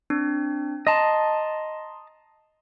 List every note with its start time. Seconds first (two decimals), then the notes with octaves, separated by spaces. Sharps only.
0.10 C4 D4
0.87 D#5 A5 A#5 C6